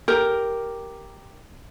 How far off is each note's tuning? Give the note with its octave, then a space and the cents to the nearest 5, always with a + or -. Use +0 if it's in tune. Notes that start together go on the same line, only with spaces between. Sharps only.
G4 +0 A#4 +0